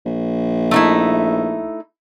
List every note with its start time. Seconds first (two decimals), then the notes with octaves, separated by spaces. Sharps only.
0.05 A#1
0.71 A3 D#4 E4